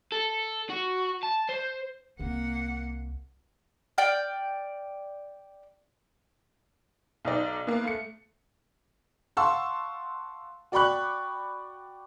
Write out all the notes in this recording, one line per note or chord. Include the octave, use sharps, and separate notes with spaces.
A4
F#4
A5
C5
C2 A#3 C4 F#5
D5 G5 F6
B1 D#4 D5
A#3 B3
A3 C#7
F5 F#5 A5 C6 C#6 E6
F#4 D5 G5 B5 C#6 F#6